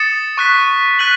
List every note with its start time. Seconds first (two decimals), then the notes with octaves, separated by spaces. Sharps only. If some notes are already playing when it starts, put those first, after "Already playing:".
Already playing: D#6 A6 C#7 E7
0.38 C#6 F#6 B6
0.99 F#6 B6 D#7 F#7